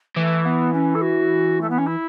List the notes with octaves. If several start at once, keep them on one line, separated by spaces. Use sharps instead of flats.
E3 A3
B3
C#4
A4
F#4
A3
B3
C#4
E4